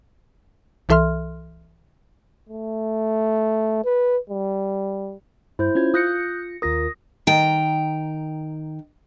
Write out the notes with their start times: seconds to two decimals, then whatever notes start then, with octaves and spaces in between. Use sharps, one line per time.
0.89 C2 E3 A4 E5 C6 F6
2.49 A3
3.85 B4
4.30 G3
5.59 G2 E4 C5 G6
5.75 C#4 F4 G#6
5.94 F4 D#6 F#6 G6 A#6 C#7
6.62 D#2 F4 A#4 D#6 A#6
7.27 D#3 G5 A#5